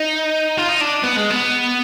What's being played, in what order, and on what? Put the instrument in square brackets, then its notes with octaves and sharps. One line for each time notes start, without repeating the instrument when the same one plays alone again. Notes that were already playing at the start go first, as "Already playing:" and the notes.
Already playing: [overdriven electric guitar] D#4
F4
D#4
D4
B3
G#3
B3